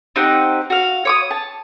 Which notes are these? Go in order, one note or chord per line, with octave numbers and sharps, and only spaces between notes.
C4 D#4 G4 F#5
F#4 F5
C#5 D6 D#6
A5